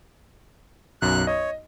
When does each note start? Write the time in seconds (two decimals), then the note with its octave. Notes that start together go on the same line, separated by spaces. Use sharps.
1.02 B1 F#2 F#6
1.27 C#5 D#5